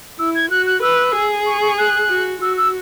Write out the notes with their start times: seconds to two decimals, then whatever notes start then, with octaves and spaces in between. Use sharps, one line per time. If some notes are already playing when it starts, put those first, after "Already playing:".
0.19 E4 E6
0.35 G#6
0.51 F#4 F#6
0.66 F#6
0.82 B4 E6
1.15 G#4
1.46 C#6
1.62 C#6
1.78 F#6
2.09 F#4
2.41 F#4 E6
2.57 E6